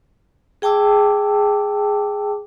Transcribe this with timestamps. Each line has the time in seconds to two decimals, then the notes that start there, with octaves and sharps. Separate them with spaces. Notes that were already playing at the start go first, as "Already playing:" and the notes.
0.62 G#4 G5 A5 D6 E6